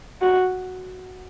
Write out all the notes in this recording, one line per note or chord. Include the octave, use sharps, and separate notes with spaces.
F#4